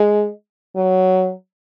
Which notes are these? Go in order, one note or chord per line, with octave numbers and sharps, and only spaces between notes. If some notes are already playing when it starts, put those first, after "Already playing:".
Already playing: G#3
F#3